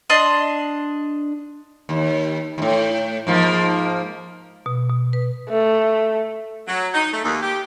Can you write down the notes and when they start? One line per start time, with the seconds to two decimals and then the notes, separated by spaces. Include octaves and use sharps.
0.10 D4 D#5 C6
1.89 D#2
2.58 D#2 A2
3.27 G#2 F3 A#3
4.66 B2
4.90 B2
5.13 B4
5.50 A3
6.68 F#3
6.94 D#4
7.12 A3
7.24 D#2
7.42 G4